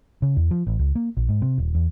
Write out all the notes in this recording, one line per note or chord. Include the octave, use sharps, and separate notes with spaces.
C#3
E2
F3
A1
C#2
A#3
A#1
G#2
C3
D#1
E2